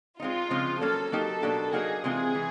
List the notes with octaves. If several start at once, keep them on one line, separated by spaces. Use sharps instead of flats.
G#3 C4 D#4 F4
C#3 F3 G#3 C4
F#3 A#3 C#4 A4
F#3 A#3 D#4 G4 A4
B2 F#3 A#3 D4 G4
F#3 A#3 D#4 F#4 G#4
C3 E3 G#3 C4 F4 G#4
E3